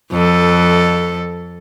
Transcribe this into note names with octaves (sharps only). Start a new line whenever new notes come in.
F2 A4